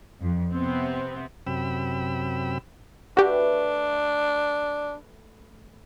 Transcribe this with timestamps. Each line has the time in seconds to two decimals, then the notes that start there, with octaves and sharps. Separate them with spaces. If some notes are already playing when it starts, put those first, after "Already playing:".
0.20 F2
0.53 C3 B3 C4
1.47 F#2 C3 G5 B5 E6
3.17 A3 D4 F#4 G4 B4